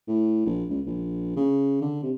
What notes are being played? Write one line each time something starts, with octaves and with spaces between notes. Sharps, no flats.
A2
A#1
C#2
A#1
C#3
D3
C3